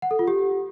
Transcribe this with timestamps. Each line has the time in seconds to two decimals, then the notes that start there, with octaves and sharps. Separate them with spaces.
0.02 F#5
0.11 A4
0.19 F4
0.27 G4